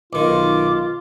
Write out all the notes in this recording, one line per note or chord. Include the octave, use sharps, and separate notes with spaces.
B1 D#3 F4 D6